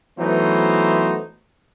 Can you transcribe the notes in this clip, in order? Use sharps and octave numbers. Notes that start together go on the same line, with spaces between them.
E3 F#3 A3 B3 D#4 C5